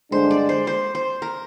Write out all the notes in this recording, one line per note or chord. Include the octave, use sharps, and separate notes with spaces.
G2 D3 G#3 D4 C5
D5
C5
C5
C5
A#4